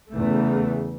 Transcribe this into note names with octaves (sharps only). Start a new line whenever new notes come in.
E2 C#3 E3 A3